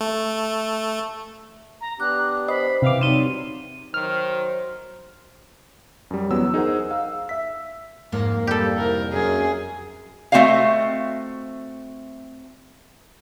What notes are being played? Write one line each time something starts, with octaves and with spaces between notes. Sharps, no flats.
A3
A#5
B3 D4 G4 D6 F#6
C5 D#5 B5
C3 E3 E5 F5 G5 D6
F#3 G3 C4 D#4 C#5 D#7
D#3 F#3 C5 F6
F#2 G3
E2 F#3 B3 E6
D#4 G#4 A#4 C5 F#5
F5 E6
E5 B6
F2 G#2 A#3
G3 G4 A4
C2 A#4
F#2 G#4
A3 C4 F#4 D#5 F5